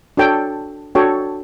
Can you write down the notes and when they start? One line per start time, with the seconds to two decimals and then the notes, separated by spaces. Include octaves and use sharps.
0.17 D4 F#4 A4 C#5 G5
0.95 D4 F#4 A4 C#5 G5